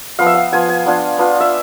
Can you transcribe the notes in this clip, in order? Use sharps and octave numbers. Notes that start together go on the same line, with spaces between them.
F3 B3 F4 F5
E5
F5
F3 B3 F4 G#5
G#5
B3 D4 F4
B3 D4 F4
E5